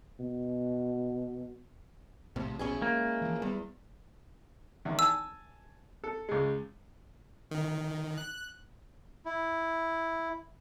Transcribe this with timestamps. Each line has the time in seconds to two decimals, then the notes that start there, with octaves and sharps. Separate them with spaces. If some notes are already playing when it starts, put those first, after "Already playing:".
0.19 B2
2.36 A#1 F2 A2 C3
2.59 A#1 B2 C#4 E4 G#4
2.82 G#3 A#3
3.22 E3 F3
3.42 E2 G3
4.85 E2 D#3
4.99 G#5 A5 E6
6.04 A4
6.29 C#2 G#3
7.51 D#3
8.18 F#6
9.26 E4